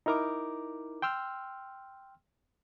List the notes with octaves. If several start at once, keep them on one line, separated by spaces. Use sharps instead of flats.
D#4 E4 A#4 A#5 D6
G5 C6 E6 F6